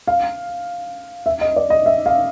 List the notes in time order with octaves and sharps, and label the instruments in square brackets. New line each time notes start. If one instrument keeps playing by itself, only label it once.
[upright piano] F5
E5
D#5
D5
D#5
E5
F5